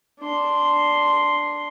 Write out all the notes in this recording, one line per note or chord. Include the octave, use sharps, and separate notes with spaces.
D4 C6